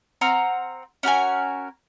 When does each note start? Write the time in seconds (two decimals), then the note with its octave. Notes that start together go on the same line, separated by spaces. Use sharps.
0.21 C4 F#5 A#5 F6
1.03 C#4 F#4 A#4 G#5